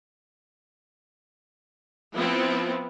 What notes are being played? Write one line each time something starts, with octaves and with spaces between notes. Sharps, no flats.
F3 B3 C4 E4 F4